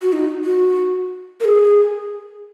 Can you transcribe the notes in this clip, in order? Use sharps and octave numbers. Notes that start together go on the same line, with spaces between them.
F#4
D#4
F#4
A#4
G#4